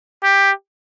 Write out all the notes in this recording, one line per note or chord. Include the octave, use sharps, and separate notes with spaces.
G4